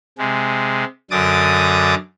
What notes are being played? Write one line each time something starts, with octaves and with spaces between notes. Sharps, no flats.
C3 G#3
F#2 D3 D6 D#6 A6